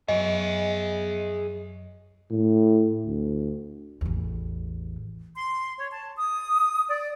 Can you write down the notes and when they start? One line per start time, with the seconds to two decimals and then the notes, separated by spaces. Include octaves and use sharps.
0.08 F#2 F#3 G#4 D#5 E5
2.31 A2
3.06 D2
4.01 A1 E2
5.35 C6
5.78 C#5
5.92 A5
6.18 D#6
6.88 D5